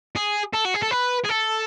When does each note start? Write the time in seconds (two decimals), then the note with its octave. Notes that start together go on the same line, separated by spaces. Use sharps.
0.16 G#4
0.54 A4
0.65 F#4
0.74 G#4
0.82 A4
0.91 B4
1.24 G#4
1.29 A4